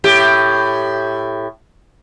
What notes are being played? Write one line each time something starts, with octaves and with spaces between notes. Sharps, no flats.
A2 G4